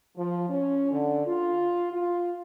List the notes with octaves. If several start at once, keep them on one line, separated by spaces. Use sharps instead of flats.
F3
C#4
D3
F4
F4